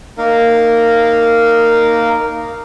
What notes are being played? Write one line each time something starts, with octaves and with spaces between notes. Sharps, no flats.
A#3 D#4 A#4 F5